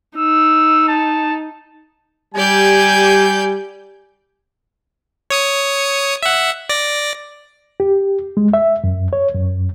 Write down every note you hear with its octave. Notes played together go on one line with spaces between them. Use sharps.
D#4 E6
A5
G3 G4 D5 G#5 G6
C#5 D#6 C#7
E5 F#5
D5 A#6
G4
G#3
E5
F#2
C#5
F#2